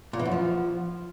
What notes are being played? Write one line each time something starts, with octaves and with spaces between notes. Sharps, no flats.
A#2
E3
F#2
F3